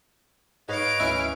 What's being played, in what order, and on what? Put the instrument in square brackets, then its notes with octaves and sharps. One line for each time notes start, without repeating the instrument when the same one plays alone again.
[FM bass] G#2 [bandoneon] B4 C#5 D#5 [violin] F5 D7
[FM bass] D2 [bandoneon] E3 C#4 [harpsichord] E4